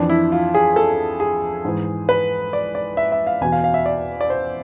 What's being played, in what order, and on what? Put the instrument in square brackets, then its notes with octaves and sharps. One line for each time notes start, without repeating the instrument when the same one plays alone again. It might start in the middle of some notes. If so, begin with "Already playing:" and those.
Already playing: [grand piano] F2 E3 D4
E4
F4
G#4
A4
G#4
G#2 E3
B4
D5
D5
E5
E5
F5
E2 B2 G#5
F5
F5
E5
D5
D5
C5